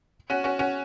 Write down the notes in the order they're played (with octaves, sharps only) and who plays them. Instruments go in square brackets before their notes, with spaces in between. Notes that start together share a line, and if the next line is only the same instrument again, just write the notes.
[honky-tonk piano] C#4 F#4
C#4 F#4
C#4 F#4